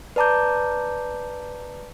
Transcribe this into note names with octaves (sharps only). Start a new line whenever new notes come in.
B4 D5 A5 A#5 D6 G6